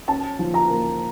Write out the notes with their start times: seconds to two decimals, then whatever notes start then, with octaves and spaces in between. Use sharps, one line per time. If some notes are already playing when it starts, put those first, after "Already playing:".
0.08 C#4 A5
0.39 F3
0.54 A#5
0.69 A#3